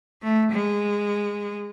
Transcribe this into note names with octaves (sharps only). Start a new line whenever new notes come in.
A3
G#3